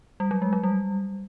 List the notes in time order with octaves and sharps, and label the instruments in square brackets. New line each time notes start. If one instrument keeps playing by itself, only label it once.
[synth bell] G3
F#3
G#3
F#3
G3